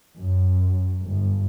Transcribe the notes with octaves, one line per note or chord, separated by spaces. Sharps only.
F#2
G1